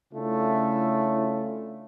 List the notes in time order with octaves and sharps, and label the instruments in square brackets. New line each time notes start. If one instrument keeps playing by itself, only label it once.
[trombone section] C#3 A3 C#4 D4 E4 F4